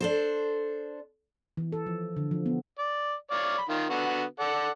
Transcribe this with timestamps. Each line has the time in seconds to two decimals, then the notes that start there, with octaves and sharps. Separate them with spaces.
0.01 D4 A4 C5
1.57 E3
1.72 A4
1.86 F3
2.17 D3
2.31 F3
2.46 B3
2.79 D5
3.31 C#5 D5 F5
3.58 B5
3.69 D#3 F4
3.90 D3 B3 F#4
4.40 A4 D5 F#5